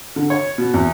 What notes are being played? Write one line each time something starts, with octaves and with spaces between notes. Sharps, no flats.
D3
C#5
B2
E2